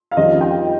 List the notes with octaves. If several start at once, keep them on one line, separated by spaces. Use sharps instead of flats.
F5
F2 D#3 G3 C#4 F4 D#5
G5